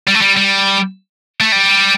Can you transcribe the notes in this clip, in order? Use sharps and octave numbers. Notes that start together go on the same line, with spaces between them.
G3
A3
G3
G3
A3
G3